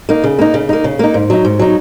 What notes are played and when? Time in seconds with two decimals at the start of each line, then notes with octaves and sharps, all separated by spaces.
0.09 A#3 D#4
0.24 C#3
0.38 A#3 D#4
0.54 C#3
0.69 A#3 D#4
0.84 C#3
0.99 A#3 D#4
1.14 G#2
1.30 F#3 D#4
1.45 G#2
1.59 F#3 D#4